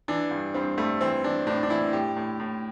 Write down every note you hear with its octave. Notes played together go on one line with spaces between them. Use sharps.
E3 D4
G2
G2 C4
G2 A3
E3 C4
E3 D4
A2 D4
D4
E3 E4
A2 G4
A2
A2